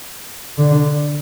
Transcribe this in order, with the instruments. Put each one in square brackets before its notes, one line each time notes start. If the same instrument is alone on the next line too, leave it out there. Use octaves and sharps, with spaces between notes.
[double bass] D3